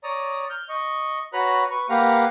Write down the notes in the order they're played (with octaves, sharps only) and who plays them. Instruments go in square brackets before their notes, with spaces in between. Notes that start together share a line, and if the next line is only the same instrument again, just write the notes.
[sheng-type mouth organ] C#5 D5 A#5 D#6
F6 G6
D#5 C#6
F#4 B4 C#5 A#5 B5 F#6
B4 C#6
A#3 G4 B4 F5 F#5 A#5